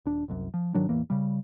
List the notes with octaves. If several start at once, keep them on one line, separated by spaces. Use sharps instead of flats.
D#1 D4
F#1 C2 F#2
F3
G#2 D#3 F#3 D4
E2 A2 E3 A#3
C#3 G3